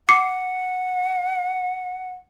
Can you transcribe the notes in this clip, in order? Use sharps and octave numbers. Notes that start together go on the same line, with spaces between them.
F#5 D6 C7 C#7